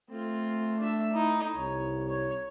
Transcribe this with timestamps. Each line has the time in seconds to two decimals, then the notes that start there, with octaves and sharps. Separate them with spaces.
0.10 A3 C4 F4
0.79 D4 E5
1.13 D#4 E4
1.56 C2 C#5
2.08 C#5